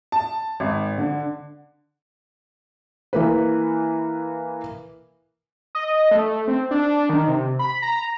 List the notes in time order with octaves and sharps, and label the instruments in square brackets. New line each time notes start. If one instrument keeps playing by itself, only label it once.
[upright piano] A5
G#1
D3
[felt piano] E3 A#3 B4
[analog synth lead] D#5
A3
C4
D4
D#3
C3
B5
A#5